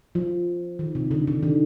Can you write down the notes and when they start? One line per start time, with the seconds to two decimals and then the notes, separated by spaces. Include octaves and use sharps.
0.15 F3
0.79 D#3
0.95 C3
1.11 D3
1.27 D3
1.43 D#3